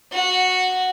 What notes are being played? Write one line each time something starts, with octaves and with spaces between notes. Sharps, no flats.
F#4